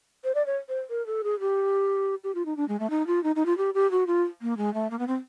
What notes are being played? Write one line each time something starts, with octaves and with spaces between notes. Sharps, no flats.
C5
D5
C#5
C5
A#4
A4
G#4
G4
G4
F4
D#4
D4
G#3
A3
D#4
F4
D#4
D#4
F4
G4
G4
F#4
F4
A#3
G#3
A3
A#3
B3
C4